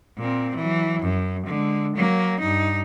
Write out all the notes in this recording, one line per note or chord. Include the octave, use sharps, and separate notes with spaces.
A#2 C4
E3 F#3
F#2
D3 G#3
F#3 A#3
G2 D#4